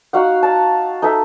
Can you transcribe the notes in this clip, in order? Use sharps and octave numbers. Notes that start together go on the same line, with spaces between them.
D#4 F#4 F5 F#5
A5 A#5
D#4 A4 D#5 E5